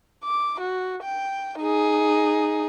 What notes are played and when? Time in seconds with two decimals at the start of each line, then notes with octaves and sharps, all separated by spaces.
0.24 D6
0.60 F#4
1.03 G5
1.59 D#4 G#4